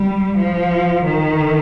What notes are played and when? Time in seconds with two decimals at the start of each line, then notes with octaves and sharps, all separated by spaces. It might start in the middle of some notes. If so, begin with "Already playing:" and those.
Already playing: G3
0.37 F3
1.04 D#3